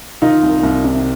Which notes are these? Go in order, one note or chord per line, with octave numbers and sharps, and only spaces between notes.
D#3 D#4 F4
C2
C2
C3